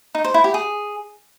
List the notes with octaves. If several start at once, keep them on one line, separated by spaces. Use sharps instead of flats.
D#4
C5
E4
G4
G#4